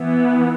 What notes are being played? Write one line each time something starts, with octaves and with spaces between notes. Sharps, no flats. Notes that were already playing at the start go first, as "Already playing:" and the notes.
Already playing: E3 B3